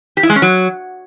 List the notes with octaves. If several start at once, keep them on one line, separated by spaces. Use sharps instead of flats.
G4
E4
G#3
C#4
F#3